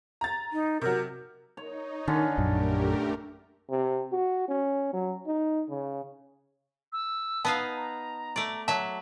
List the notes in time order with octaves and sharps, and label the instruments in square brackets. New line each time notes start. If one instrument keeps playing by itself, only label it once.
[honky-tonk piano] A#5 A6
[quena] D#4
[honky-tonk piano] C3 F#3 [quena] A#4
[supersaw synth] D#4 [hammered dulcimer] C#5
[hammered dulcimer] D3 C#4 [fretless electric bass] D#3
[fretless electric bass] A#1 F#2 [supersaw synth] A3 G4 A#4
[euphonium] C3
F#4
C#4
F#3
D#4
C#3
[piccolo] E6
[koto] B3 D#4 F5 [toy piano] A5
[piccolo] A#5
[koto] A3 D5
[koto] F#3 E5 [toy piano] A5